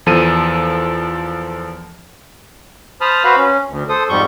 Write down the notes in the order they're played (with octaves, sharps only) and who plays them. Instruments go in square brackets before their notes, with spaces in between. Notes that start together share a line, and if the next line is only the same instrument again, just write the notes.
[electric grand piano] E2 F3 A4 D#7
[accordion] C5 A5 B5 D#6 F6
F#4 B4 C5 F5 B5
C#4
D2
A4 C5 D#6
F2 G#2 G3 C#6 G6